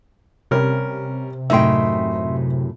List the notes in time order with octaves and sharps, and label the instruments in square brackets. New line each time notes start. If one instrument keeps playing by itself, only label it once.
[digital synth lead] C3 [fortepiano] G3 C#4 A#4
[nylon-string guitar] F#2 A2 G5 [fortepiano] D#4 [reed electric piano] E5 C6